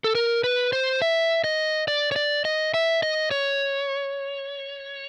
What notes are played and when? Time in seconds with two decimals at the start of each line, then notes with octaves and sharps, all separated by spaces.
0.04 A4
0.15 A#4
0.44 B4
0.73 C5
1.02 E5
1.44 D#5
1.88 D5
2.12 C#5
2.16 D5
2.45 D#5
2.74 E5
3.03 D#5
3.31 C#5